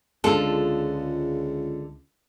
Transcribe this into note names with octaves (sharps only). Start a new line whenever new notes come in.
C#2 D3 G#3 F4 A4